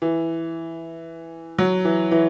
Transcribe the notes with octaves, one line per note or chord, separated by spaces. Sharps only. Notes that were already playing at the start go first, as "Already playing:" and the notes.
E3
F#3
E3
E3